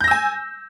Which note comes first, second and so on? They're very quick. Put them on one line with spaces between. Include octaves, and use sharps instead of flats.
G6 A#6 E6 G#5